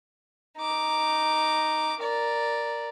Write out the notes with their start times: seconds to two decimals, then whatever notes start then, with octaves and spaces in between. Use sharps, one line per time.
0.58 D#4 D6
2.00 A#4 D5